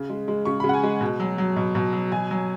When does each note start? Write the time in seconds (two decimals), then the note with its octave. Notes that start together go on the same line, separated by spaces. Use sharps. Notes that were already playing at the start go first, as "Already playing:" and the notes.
Already playing: C#3
0.10 G#3
0.28 G#3
0.45 C#3 C#6
0.60 C#3 B5
0.69 F#5
0.74 G#5
0.83 G#3
1.01 B2
1.20 F#3
1.38 F#3
1.56 B2
1.75 B2
1.93 F#3
2.12 B2 G#5
2.31 F#3